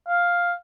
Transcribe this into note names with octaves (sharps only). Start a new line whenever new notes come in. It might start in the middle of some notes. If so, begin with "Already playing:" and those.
F5